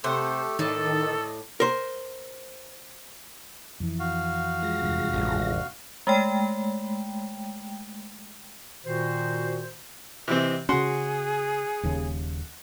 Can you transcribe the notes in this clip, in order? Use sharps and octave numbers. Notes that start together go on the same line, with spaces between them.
C3 A3 G4 A4 C5 F#5
A2 D#3 A4 D5 D#5 A5
A#4 C5
F2 E3
F#4 F5
G#3 F4 A#6
F1 E2 G2
A1
G#3 A3 G5
A#2 D#3 F#4 C5
C3 E3 C4 D#5
C#3 C#4 F#4 G#4 C6
D#1 D#2 C#3